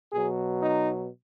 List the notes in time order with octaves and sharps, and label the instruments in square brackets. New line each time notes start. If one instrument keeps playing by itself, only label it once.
[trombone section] B2 F#3 G#4
D#4